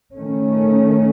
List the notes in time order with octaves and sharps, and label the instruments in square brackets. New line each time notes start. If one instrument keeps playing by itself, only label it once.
[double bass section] D#3 A3 C#4